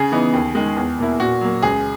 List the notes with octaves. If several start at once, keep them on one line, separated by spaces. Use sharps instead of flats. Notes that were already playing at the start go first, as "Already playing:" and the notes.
Already playing: C#3 G#4
E3 B3 D#4
D#2
D#3 G#3
E2
B2 A#3 E4
A#2 F#4
F#3 A#3
C#2 G#4